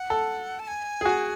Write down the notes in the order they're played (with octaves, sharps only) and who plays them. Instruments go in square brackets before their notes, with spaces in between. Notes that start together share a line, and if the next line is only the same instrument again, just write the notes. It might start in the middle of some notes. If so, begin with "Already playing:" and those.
Already playing: [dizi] F#5
[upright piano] A4
[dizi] A5
G#5
[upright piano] G#4
F#4